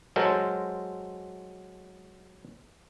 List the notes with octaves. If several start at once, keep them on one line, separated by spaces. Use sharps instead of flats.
F#3 G#3 A4 A#4 C5